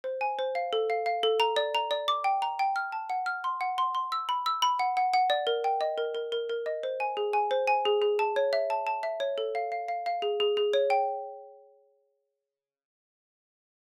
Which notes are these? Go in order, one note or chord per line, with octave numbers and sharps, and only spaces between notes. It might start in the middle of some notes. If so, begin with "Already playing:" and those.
C5
G#5
C5
F5
A4
F5
F5
A4
A#5
D5
A#5
D5
D6
G5
A#5
G5
F6
A5
F#5
F6
C6
F#5
C6
C6
E6
B5
E6
B5
F#5
F#5
F#5
D5
A#4
G5
D#5
A#4
A#4
A#4
A#4
D#5
C5
G#5
G#4
G#5
C5
G#5
G#4
G#4
A5
C#5
E5
A5
A5
E5
C#5
A4
F5
F5
F5
F5
G#4
G#4
G#4
C#5
G5